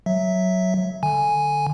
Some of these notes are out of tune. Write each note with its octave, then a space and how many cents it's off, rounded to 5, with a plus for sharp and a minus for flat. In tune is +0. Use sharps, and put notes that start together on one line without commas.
F#3 +0 E5 +0
D3 +0 G#5 +0